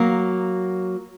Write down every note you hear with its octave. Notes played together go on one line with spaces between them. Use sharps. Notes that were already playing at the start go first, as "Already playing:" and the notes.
Already playing: F#3 A#3